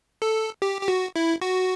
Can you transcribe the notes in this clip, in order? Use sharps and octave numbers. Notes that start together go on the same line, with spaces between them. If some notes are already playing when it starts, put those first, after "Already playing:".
A4
G4
G4
F#4
E4
F#4